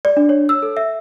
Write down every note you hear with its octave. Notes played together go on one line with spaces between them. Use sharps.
D5
D4
C#5
E6
A4
E5